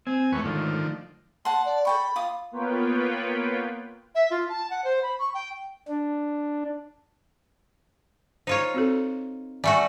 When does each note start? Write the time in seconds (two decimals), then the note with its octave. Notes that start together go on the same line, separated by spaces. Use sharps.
0.07 C4 G#5
0.32 E2 G#2 A3 A4 B4 C#6
0.45 D3 D#3 F3
1.45 F#5 A5 C6
1.65 D5
1.85 A4 G5 B5 C#6
2.16 F4 D6 D#6
2.52 A#3 B3 F4 B4 C#5 G5
4.15 E5
4.31 F4
4.49 A5
4.70 F#5
4.84 C5
5.03 B5
5.19 C#6
5.34 G5
5.88 D4
8.47 D#4 F4 C5 C#5
8.74 C4 F#4 A4
9.64 G3 A3 F#4 D5 E5 G#5